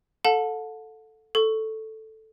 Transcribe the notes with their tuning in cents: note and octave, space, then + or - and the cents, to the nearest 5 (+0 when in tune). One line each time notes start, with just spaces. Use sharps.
A4 +0 F#5 -40 A5 +0
A4 +0 C#6 +0